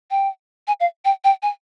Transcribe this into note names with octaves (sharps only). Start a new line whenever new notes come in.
G5
G#5
F5
G5
G5
G#5